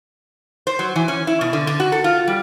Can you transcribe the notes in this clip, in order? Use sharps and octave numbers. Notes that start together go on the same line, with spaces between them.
C5
F#3
E3
C#4
E4
B2
D3
D3
F#4
A4
F4
G3